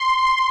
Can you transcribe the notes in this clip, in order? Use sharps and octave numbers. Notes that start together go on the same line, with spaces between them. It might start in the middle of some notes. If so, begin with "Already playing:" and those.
Already playing: C6